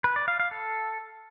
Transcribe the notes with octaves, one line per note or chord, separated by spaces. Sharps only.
B4
D5
F5
F5
A4